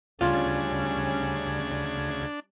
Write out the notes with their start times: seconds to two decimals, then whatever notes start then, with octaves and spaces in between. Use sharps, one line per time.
0.21 D2 C#3 G3 C#4 D4 F4 G#6